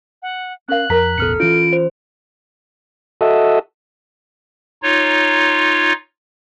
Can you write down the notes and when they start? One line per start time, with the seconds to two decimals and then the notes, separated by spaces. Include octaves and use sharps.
0.22 F#5
0.68 C#4 A#4 F5 F#6
0.90 F2 A#4 A#5 B6
1.18 A1 E2 B2 A4 F6 C#7
1.40 E3 C#4 F4 D7
1.73 C5
3.21 F#4 A4 D#5 E5
4.83 D#4 F4 C#5